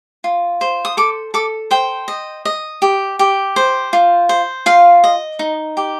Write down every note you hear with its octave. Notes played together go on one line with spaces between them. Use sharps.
F4
C5
D#6
A4 D6
A4 D6
C5 G5
D#5
D#5
G4
G4
C5
F4
C5
F4 F5
D#5
D#4
G4